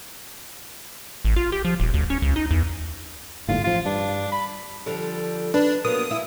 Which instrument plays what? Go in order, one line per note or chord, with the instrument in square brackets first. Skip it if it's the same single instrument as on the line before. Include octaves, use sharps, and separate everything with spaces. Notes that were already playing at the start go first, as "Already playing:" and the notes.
[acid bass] A1
F4
G4
F3
D#1
D2
C#4
C#2
D#4
E2
[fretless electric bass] G1 D#2 A2 [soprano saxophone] F4
[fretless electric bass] A1 F3 [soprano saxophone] F4
[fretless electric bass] G2 [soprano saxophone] D4
[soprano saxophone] B5
[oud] D3 F3 G3
[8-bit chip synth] D4 [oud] B4
[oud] F#3 A#3 B3 [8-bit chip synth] D#6
[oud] E4